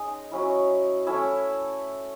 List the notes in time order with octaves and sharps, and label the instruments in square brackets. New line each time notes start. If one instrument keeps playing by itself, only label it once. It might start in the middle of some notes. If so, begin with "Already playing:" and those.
Already playing: [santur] G#3 C#4 D#4 D#5
F#3 C#4 E4
A3 C#4 E4 E5